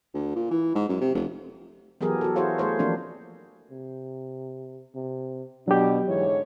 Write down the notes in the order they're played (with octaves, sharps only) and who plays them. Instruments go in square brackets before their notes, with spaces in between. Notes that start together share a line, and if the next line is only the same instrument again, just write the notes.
[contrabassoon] D2
A#2
E3
G#2
F#2
C3
F1
[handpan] E3 F#3 B3 G4 G#4 A#4
F#4 A4
E4 F#4 G#4 C5 C#5 F5
A3 G#4 C5 C#5
E3 F3 A#3 C4 D4
[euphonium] C3
C3
[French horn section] B2 [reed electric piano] F#3 G4 [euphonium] D4
[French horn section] G#2 D3 C#5 [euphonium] E3